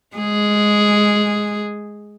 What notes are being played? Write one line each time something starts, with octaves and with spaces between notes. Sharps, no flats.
G#3 G#4